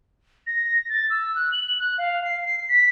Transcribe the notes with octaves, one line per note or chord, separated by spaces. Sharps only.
A#6
A6
E6
F#6
F#7
F#6
F5
C7
C7
B6